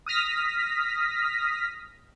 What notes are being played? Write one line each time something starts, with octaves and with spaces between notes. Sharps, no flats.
D#6 F6 A#6 B6